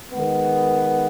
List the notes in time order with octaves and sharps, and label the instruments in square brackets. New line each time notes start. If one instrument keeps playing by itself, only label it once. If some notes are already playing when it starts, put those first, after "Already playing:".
[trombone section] D#3 G#3 B3